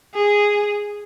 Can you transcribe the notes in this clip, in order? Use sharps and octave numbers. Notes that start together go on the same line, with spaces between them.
G#4